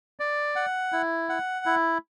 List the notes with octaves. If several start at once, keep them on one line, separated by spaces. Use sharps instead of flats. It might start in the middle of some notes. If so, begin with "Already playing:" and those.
D5
F#5
E4
F#5
E4